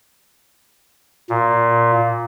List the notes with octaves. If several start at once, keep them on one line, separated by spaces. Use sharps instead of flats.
A#2